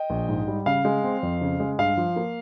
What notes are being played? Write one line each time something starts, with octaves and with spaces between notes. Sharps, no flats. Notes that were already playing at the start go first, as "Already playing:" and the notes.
Already playing: D#5 G5
A#1
G#2
G3
C#3 F5
G#3
C4
F2
C#3
G#3
G2 F5
F3
A#3